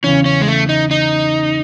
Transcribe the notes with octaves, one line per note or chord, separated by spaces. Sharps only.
E2 C#3 E3 C#4
C#4
G#3
A3
D#4
D#4